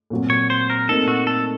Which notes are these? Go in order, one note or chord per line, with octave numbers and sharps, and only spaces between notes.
A#2 F#3 C4
C#5
C5
A#4
A#2 A3 C4 D#4 A4 A#4
F#4
A4